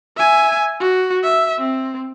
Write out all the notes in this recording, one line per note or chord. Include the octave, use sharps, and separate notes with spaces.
E5 G#5
F#4
E5
C4